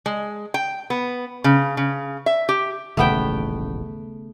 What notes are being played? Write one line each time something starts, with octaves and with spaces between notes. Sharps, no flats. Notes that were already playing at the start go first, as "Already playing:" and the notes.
G#3
G5
B3
C#3
C#3
E5
G4
D#1 A1 G#2 C#3 A3 B3 G5